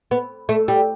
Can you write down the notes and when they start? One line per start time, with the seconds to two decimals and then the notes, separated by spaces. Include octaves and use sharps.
0.11 B3
0.49 A3
0.68 G3